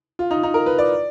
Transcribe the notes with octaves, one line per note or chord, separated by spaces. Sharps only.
F4
D#4
D#4
A#4
B4
D5